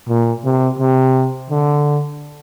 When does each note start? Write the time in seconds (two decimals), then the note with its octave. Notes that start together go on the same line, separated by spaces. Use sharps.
0.09 A#2
0.44 C3
0.79 C3
1.50 D3